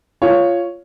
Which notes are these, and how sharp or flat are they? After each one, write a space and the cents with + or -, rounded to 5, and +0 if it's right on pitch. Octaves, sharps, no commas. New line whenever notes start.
F4 -10 C#5 +0